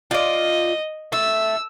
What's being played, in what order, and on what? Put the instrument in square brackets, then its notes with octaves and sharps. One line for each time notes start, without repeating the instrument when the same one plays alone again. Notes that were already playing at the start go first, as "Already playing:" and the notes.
[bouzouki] F4 D5 [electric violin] D#5
[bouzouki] A3 [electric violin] E6